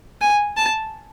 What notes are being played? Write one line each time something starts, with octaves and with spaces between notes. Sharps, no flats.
G#5
A5